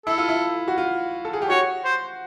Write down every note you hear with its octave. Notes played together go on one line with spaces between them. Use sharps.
E4 A4
F4
E4
F#4
F4
A4
G#4
G4
F#4 C#5
C5